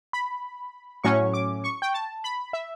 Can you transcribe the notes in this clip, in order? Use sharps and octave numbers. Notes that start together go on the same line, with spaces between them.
B5
A2 F#3 C#4 C#6
D6
C#6
G5
A5
B5
E5